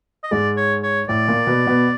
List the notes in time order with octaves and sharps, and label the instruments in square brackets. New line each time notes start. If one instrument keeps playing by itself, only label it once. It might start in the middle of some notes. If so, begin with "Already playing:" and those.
[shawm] D#5
[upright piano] G#2 G#3 [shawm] D5
[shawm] C#5
C#5
[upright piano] A2 A3 [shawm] D5
[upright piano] A#2 A#3
B2 B3
B2 B3